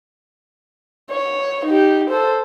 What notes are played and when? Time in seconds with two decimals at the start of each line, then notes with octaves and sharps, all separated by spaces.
1.11 C#5
1.65 D#4 G4
2.10 A4 C5